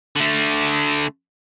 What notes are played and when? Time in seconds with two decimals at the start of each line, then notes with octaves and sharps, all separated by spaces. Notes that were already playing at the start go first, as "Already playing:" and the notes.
0.16 D3 A3